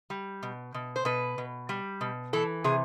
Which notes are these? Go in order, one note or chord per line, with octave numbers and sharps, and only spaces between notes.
G3
B2
B2
C5
B2 B4
B2
G3
B2
E3 A4
C3 G#4